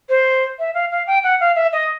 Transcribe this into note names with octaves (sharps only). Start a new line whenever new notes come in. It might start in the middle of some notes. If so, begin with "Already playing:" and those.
C5
E5
F5
F5
G5
F#5
F5
E5
D#5